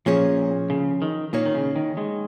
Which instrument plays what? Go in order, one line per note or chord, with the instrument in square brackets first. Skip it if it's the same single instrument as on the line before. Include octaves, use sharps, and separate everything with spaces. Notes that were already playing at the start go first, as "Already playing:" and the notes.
[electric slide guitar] A#2 [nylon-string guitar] F3 C#4 G#4 C#5
[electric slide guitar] C#3
D#3
[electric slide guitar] A#2 [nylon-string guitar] A#3 D#4 C#5
[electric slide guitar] D#3
C#3
D#3
D#3 G#3